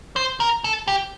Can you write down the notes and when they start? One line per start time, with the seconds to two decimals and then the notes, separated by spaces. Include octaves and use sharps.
0.16 C5
0.40 A#4
0.64 A4
0.88 G4